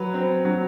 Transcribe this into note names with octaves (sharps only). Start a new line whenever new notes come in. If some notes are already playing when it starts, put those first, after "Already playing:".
Already playing: F#3 B4
C4
F#3